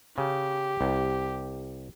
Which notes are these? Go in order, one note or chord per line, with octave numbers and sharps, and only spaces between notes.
C#3 G4
C2